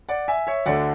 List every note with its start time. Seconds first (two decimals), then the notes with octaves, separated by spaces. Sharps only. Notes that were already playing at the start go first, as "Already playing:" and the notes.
0.09 D5 F#5
0.28 E5 G#5
0.47 C#5 E5
0.66 D2 D3 A3 D5 F#5